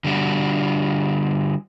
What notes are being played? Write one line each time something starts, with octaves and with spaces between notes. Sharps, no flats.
D3 G3 D4 F#4